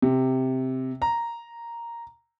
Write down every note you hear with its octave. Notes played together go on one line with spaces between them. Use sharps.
C3
A#5